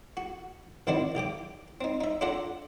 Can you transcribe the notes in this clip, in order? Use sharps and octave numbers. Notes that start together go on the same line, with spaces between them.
F#4
A1 D#3 C4 E4 F#4 D5
B1 G4 G5 D6
C4 D#4
D#4 E5
D4 F4 A4 D5 F#5 A#5